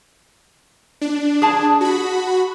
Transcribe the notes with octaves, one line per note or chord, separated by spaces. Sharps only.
D4
G#4 A5
F#4 B5